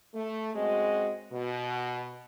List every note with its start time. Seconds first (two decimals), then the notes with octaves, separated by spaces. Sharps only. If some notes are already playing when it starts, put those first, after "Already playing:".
0.14 A3
0.54 F#2 G#3 C4 F#4 D#5
1.32 B2